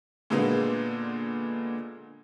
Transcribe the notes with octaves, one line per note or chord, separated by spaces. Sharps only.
A#2 D3 G#3 A#3 B3